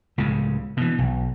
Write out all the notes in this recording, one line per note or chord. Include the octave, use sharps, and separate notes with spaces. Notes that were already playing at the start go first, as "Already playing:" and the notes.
C#2 A2 C#3
B2 E3
B1